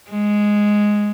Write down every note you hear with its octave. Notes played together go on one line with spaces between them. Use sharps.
G#3